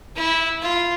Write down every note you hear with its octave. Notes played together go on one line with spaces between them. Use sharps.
E4
F4